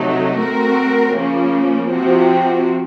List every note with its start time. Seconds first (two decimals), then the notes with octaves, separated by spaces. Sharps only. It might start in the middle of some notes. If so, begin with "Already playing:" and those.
Already playing: C3 F#3 A3 D#4
0.39 A3 C4 F#4 A#4
1.15 C#3 F3 A#3 C#4
1.91 C3 F3 C4 F#4